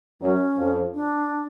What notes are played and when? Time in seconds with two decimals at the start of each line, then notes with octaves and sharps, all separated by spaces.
0.21 F#2 F#3 C#4
0.57 F2 F3
0.94 D4